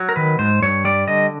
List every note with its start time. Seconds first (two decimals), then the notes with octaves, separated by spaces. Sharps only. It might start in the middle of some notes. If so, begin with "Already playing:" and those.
Already playing: F#3
0.09 A#4
0.16 D#3 B4
0.39 G#2 C5
0.62 G2 C#5
0.84 G3 D5
1.07 D3 D#5